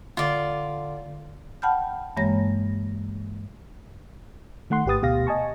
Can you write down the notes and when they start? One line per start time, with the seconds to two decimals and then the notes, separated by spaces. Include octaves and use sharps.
0.17 D3 F4 D5
1.62 F#5 G5 A5 B5 F6 G6
2.17 G2 E3 G#3 A#3 C#5 A#6
4.70 D#3 A3 F#5 C6
4.86 G#1 G4 B4 D#6 A6
5.02 D2 B2 G4 F5 A#6
5.27 D#5 G#5 A5 C#6